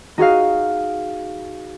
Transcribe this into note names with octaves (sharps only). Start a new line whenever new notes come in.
D#4 F#4 G#4 F5